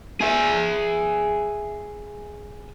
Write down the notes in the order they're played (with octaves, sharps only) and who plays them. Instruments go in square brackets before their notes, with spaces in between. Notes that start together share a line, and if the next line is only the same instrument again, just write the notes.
[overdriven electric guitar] G#4 E5